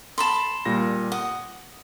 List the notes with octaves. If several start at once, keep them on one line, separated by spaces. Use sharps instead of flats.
A5 B5 C6
A#2 G3 A#6
F#5 D#6